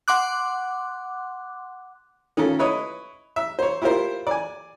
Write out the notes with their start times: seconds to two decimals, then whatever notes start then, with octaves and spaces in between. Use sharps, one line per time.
0.08 F#5 C6 D6 F#6
2.37 D#3 C#4 F4 A4
2.59 E4 B4 C#5 D#5
3.36 E5
3.59 C5 C#5
3.82 E4 F4 G4 A#4 C5
4.27 D5 G#5